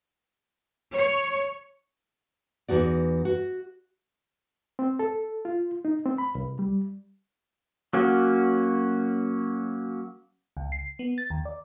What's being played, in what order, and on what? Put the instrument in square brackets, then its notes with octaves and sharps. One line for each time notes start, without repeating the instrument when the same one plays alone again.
[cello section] C#5
[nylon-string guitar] E2 D#4 F#4 D5
F#4
[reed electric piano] C4
A4
F4
D#4
C4
B5
C2
G3
[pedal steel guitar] F#3 A#3 C#4 F#4
[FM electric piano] C#2
C7
B3
A6
D#2
D5